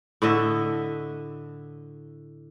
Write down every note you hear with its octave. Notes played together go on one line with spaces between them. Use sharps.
A2 D3 D#5 E5